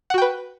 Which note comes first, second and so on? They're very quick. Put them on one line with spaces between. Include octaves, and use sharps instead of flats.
F#5 F#4 G5 B4